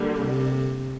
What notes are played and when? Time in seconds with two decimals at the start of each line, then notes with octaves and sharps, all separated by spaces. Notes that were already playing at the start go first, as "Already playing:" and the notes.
Already playing: D3 G3 A#3
0.20 C3